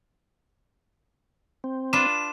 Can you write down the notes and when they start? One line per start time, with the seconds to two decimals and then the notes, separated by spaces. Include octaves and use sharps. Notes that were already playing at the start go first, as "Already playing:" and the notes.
1.64 C4
1.93 D4 F4 B4 E7